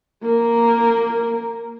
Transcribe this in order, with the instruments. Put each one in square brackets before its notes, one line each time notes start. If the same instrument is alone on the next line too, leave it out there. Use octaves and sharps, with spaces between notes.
[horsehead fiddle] A#3 A#4